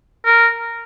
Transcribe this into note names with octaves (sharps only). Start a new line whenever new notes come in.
A#4